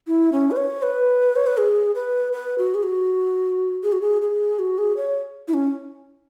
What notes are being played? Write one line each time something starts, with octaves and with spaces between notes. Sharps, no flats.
E4
C#4
B4
C#5
B4
C#5
B4
G#4
B4
B4
F#4
G#4
F#4
G#4
F#4
G#4
G#4
F#4
G#4
C#5
E4
C#4